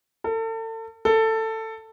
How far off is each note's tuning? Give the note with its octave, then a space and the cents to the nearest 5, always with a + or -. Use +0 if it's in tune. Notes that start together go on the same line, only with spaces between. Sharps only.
A4 +35
A4 +15